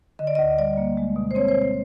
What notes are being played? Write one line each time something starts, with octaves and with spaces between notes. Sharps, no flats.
D3 D#5
D5
D#5
D2
G3 D5
A#3
G#3
B2
C5
C4 C#5
C5
B2
C5